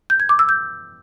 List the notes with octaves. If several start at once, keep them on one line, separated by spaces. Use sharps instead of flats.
G6
G#6
D6
E6
G6